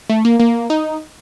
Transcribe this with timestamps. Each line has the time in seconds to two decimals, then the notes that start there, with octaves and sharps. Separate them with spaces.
0.09 A3
0.25 A#3
0.40 A#3
0.70 D#4